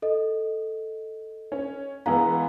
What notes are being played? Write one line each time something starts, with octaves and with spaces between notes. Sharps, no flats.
A4 D#5
C#4
E3 G#3 B3 G#4 F5 A#5